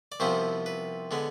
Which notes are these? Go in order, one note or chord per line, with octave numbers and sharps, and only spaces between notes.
D5
C2 C3 F3 B3 C5
B4
D3 G#3 B3